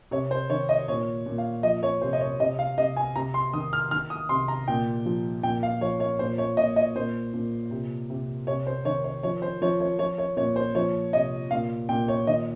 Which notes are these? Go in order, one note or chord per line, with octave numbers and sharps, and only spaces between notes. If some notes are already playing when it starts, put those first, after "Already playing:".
C3 C#5
C5
D#3 C#5
D#5
A#2 C#5
A#2
F5
F3 D#5
C#5
C3 C5
D#5
C#5
C3 D#5
F5
C3 D#5
G#5
C3 A#5
C6
D#3 D#6
F6
D#3 F6
D#6
C3 C6
A#5
A#2 G5
F3
A#2 G5
F5
F3 C#5
C#5
A#2 C5
C#5
A#2 D#5
D#5
A#2 C5
A#2
C3
C3
C3 C#5
C5
D#3 C#5
C#5
F3 C#5
C5
F3 C#5
C#5
F3 C#5
C#5
A#2 C#5
C5
F3 C#5
C3 D#5
A#2 F5
A#2 G5
C#5
D#3 D#5